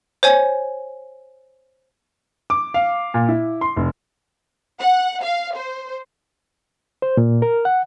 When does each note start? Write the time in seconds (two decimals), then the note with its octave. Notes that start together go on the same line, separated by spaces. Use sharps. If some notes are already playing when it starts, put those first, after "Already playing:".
0.23 C5 C#5 G#5
2.50 D6
2.74 F5
3.14 A#2
3.29 E4
3.61 C6
3.76 F1
4.80 F#5
5.22 F5
5.56 C5
7.02 C5
7.17 A#2
7.42 A#4
7.65 F#5